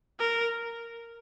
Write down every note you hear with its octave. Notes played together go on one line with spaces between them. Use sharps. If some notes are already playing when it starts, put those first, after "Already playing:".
A#4